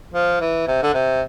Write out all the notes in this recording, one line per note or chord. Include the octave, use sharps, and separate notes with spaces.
F3
E3
C3
D3
C3